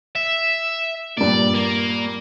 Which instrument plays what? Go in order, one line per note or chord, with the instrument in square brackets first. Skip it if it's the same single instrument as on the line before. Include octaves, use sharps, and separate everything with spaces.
[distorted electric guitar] E5
[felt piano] G2 A#2 [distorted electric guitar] D5
[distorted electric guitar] A#3